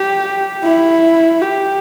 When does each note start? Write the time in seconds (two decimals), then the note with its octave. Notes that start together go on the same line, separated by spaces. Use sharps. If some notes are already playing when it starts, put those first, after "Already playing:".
Already playing: G4
0.64 E4
1.41 G4